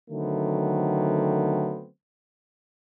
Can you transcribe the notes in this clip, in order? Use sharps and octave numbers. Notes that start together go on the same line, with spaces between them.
D3 D#3 F#3 A3 B3 C4